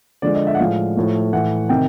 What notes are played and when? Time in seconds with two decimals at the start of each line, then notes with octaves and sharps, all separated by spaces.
0.22 D3 F3 G#3 D5
0.35 D#5
0.47 E5
0.55 F#5
0.59 A2 F3 G#3 F5
0.96 A2 F3 A3
1.33 A2 E3 A3 F#5
1.69 C3 D#3 G5